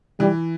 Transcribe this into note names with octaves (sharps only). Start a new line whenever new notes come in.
E3 G3